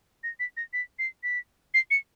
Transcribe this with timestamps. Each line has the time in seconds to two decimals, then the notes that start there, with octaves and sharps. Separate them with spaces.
0.24 A#6
0.40 B6
0.57 A#6
0.73 B6
0.99 C7
1.23 B6
1.74 C7
1.91 C#7